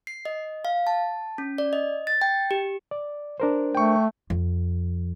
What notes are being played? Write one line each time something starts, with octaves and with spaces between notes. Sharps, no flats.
C7
D#5
F5
A5
C#4
D5
D#5
A6
G5
G4
D5
D4 A#4 C5
A3 G5 C#6
F2